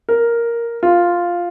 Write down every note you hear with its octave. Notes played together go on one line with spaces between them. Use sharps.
A#4
F4